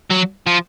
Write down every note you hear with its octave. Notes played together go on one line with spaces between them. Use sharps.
F#3
F3